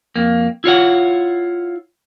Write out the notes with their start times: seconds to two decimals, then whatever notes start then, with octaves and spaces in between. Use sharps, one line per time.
0.16 F2 A#3
0.64 E4 F4 C#5 F#5